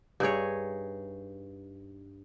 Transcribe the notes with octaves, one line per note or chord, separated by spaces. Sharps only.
G2 D#4 G#4 C#5